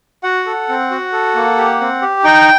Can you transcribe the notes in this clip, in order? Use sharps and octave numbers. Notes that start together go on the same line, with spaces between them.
F#4 F#5
A4
C4
F#4
A4
A#3
G4
C4
G4
D#4 G5